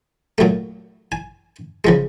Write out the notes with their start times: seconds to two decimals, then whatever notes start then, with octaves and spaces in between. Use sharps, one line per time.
0.38 A#2 F#3 A3
1.12 G#5
1.84 C#3 F3 G#3